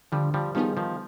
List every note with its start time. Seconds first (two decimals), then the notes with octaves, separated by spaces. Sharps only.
0.12 D3 F3 G3
0.34 F3 G3
0.55 D#3 F3 G3 B3 D#4 G#4
0.77 D#3 F3